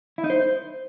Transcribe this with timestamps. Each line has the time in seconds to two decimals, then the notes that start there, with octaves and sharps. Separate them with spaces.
0.18 E4
0.24 D#4
0.30 C5